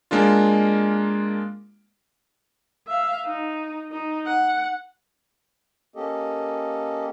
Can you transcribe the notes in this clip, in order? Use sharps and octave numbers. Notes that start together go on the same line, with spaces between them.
G#3 A#3 D4 F4
E5 F5
D#4
D#4
F#5
A#3 C#4 G4 A4 D#5